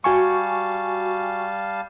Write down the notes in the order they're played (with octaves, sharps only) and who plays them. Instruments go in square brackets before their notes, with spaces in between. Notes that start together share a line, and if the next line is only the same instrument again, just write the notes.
[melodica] G3 F5 A5 [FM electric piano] F#4 G#5 C#6